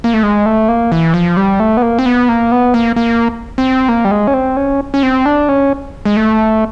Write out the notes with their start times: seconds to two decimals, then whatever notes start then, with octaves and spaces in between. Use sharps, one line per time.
0.04 A#3
0.14 A3
0.23 G#3
0.46 A3
0.68 A#3
0.92 E3
1.14 F3
1.37 G3
1.60 A3
1.77 B3
1.82 A#3
1.99 C4
2.06 B3
2.29 A#3
2.51 B3
2.74 A#3
2.96 A#3
3.58 C4
3.89 A#3
4.05 G3
4.11 G#3
4.27 C#4
4.34 C4
4.57 C#4
4.94 C#4
5.03 C4
5.25 D4
5.49 C#4
6.05 G#3
6.17 A3